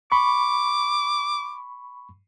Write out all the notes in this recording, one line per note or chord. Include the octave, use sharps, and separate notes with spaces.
B5 C#6 D6